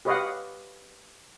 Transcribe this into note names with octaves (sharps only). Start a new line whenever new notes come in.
G4 B4 C#5 D#5 F5 F#5